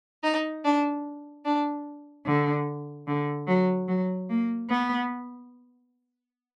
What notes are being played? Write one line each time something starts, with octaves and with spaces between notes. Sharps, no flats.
D#4
D4
D4
D3
D3
F#3
F#3
A#3
B3